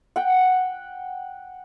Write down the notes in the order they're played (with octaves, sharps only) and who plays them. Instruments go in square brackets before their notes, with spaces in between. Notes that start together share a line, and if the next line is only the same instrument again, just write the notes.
[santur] F#5 G5